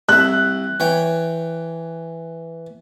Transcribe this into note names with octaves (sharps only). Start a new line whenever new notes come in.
C2 E5 F#6
E3 C#5 G5